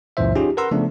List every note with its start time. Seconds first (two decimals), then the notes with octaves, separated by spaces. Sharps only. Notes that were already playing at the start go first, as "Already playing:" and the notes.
0.17 C#2 F#2 A#2 E3 C5 E5
0.35 C#4 D#4 F4 G4 G#4
0.57 A#4 B4 F#5 A#5 C6 E6
0.71 C#3 F3 A3 B3 D4